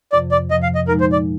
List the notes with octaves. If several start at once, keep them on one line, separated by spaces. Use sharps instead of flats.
F2 C3 F3 D5
D5
F2 C3 F3 D#5
F5
D#5
A#2 F3 G#3 D#4 A#4
C5
D5